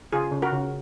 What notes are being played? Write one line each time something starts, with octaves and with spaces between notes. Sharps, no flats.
C#3 F4 G#4
C#3
F#4 A#4
C#3